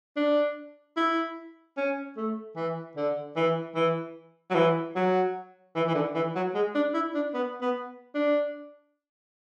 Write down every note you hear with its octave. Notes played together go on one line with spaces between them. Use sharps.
D4
E4
C#4
A3
E3
D3
E3
E3
F#3
E3
F#3
E3
E3
D3
E3
F#3
G#3
D4
E4
D4
B3
B3
D4